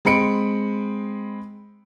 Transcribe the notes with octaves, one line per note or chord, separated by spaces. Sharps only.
G#3 C4 B5 C#7 D7